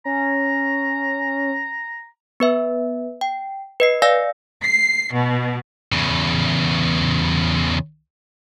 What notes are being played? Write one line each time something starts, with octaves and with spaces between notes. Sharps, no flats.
C#4 A#5
B3 B4 E5
G5
B4 D#5 C7
D5 F5 G#5 E6 A#6
C7
B2
E2 C#3